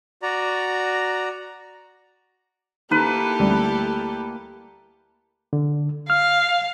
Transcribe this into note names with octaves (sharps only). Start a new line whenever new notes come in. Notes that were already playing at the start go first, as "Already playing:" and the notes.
F#4 D5 A#5
D#3 A#3 E4 G4 A4 B4
D2 G3
D3
F5 F6